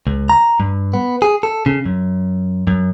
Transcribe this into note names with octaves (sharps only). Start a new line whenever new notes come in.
C#2
A#5
G2
B3
G#4
A4
C#3
F#2
F#2